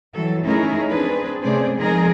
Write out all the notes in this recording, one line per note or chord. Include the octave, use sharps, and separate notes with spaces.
E3 F#3 G3 A4
A3 C#4 D#4 E4 G#4 A#4
C4 D4 G#4 B4
C3 A3 C#4 G#4 C5 D5
F3 G#3 C4 D#4 G#4 A#4